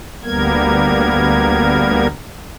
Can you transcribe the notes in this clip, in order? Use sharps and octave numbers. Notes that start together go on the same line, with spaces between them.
D2 G3 A#3 B3 A#4 G#6